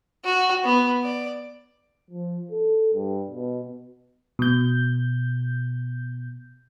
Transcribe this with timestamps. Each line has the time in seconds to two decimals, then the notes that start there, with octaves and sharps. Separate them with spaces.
0.25 F#4
0.64 B3
1.04 D5
2.10 F3
2.51 A4
2.94 G2
3.30 B2
4.39 B2 G6